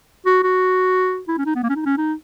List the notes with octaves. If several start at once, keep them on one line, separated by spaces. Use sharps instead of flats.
F#4
F#4
E4
C#4
D#4
B3
A#3
C#4
D#4
C#4
D#4